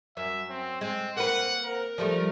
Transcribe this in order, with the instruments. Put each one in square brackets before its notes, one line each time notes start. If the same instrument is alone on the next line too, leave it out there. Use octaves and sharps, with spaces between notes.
[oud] F#2 [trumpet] E5
[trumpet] C4
[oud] G#3 [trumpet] C4
[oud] A#3 C4 B4 [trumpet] F#5
[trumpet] A#4
[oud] F3 G3 A3